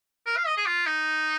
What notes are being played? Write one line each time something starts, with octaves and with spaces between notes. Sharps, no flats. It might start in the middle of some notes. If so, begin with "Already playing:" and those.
A#4
F5
D#5
G#4
F4
D#4